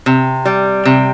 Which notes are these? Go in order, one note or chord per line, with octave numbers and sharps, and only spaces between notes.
C3
G3
C3